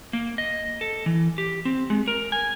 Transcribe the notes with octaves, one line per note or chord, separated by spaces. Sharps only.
A#3
D#5
A4
E3
G4
C4
G#3
A#4
G#5